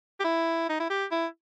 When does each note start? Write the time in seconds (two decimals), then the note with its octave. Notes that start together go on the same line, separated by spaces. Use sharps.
0.20 G4
0.24 E4
0.69 D#4
0.80 E4
0.90 G4
1.11 E4